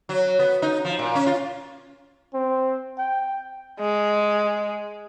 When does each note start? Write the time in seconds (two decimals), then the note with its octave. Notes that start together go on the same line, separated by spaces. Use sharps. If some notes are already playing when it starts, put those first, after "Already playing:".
0.09 F#3
0.39 B3
0.62 D#4
0.85 F3
0.99 A#2
1.15 C#4
1.26 F4
2.34 C4
2.98 G5
3.80 G#3